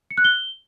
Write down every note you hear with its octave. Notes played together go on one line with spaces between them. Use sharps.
C#7
F#6
G7